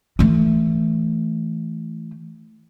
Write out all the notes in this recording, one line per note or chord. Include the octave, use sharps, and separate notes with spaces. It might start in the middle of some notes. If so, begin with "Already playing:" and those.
E3 A3